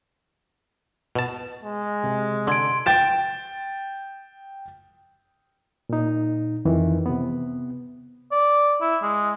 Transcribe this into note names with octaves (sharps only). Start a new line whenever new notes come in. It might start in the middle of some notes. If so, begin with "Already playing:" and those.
B2 A5
G#3
C3
D3 C6 G#6 D7
G5 A6 E7
A#2 D#4
F2 D#3 E3
C3 B3
D5
E4
G#3